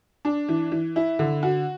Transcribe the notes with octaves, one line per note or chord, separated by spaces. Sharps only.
D4
E3
E3
E4
D3
F#4